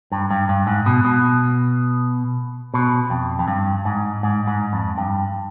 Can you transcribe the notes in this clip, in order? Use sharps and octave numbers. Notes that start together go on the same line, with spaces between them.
G2
G2
G2
G#2
B2
B2
B2
F2
F2
G2
G#2
G#2
G#2
F2
G2